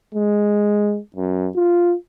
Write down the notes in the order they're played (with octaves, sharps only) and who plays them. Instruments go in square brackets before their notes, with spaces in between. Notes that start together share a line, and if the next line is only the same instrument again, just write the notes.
[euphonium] G#3
F#2
F4